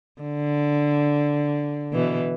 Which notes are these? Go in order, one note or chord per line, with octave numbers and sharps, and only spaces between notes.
D3
B2 E3